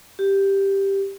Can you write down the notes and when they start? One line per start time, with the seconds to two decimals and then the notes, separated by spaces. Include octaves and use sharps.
0.19 G4